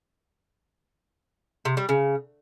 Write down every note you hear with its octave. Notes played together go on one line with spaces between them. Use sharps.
C3
G3
C#3